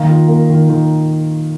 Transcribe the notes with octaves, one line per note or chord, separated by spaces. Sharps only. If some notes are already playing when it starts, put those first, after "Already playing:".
Already playing: D#3 A#3 F5 A#5
F4
A#3
D#3
D#3